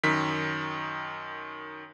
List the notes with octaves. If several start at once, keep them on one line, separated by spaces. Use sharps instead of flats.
F#2 D#3 B6